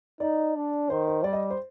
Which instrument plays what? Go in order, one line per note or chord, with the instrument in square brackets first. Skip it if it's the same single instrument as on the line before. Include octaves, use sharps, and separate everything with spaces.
[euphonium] D#4 [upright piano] D5
[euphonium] D4
[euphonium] D#3 [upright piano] C5
[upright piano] C5
[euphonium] G3 [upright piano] D5
[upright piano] D#5
C5